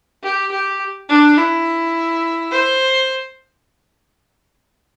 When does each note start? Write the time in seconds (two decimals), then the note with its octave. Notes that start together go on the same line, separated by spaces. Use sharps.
0.23 G4
0.51 G4
1.09 D4
1.37 E4
2.52 C5